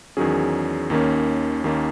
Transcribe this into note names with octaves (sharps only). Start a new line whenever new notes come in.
E2 D#3 F#3 C#4 G#4
D#2 D#3 A#3 C#4
D#2 D#3 A#3 C#4